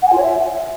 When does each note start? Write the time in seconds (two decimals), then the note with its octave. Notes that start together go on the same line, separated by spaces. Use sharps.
0.02 F#5
0.07 G#5
0.12 F4
0.17 C#5
0.22 E5